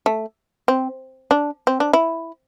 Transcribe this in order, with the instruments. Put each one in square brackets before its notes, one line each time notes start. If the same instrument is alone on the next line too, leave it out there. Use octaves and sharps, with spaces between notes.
[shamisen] A3
C4
D4
C4
D4
E4